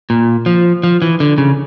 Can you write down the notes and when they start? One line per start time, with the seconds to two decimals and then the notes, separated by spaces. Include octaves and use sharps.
0.10 A#2
0.46 F3
0.83 F3
1.02 E3
1.20 D3
1.38 C#3